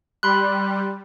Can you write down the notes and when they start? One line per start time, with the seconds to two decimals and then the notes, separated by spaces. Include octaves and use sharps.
0.23 G3 B5 C6 F#6